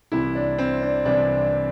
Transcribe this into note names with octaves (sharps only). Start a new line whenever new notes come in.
C2 C3 E3 E4
D4
C4
D4
C2 C3 E3 D4